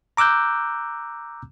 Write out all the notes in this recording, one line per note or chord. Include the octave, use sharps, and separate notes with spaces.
A#5 D6 E6 F#6 G6